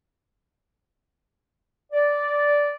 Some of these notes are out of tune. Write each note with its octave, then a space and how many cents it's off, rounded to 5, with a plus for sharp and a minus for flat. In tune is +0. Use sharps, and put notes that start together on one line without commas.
D5 -10